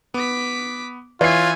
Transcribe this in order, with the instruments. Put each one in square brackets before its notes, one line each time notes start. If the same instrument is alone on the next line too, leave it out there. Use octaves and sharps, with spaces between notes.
[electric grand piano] B3 [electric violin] D6 B6
[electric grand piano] E3 [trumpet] F4 [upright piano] C#5 C7 [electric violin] E5 G#5